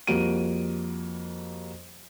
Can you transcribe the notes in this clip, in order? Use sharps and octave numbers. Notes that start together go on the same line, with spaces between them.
F2 G3 A#3 F#4 D7 D#7